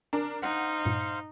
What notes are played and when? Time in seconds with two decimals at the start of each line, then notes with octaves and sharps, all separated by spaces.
0.13 D4 A#4 G#5
0.42 D#4 C5 F5 F#5
0.86 G2 A#2